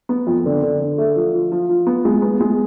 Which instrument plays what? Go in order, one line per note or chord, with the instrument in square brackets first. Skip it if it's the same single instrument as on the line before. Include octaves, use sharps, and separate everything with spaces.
[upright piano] B3
F2
D3
D3
D3
A3
F3
F3
F3
F3
B3
G#3
B3
G#3